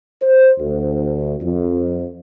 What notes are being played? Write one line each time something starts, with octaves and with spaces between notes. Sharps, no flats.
C5
D2
F2